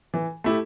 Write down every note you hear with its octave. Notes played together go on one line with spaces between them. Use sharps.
E3
A3 E4 G4